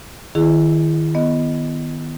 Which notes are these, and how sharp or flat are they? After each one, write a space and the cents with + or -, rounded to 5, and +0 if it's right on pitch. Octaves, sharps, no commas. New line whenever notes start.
D#3 -5 E4 +25 G#4 +0
B3 +0 D#5 +0